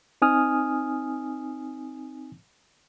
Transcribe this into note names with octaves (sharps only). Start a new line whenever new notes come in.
C4 D#4 G#5 D#6 F6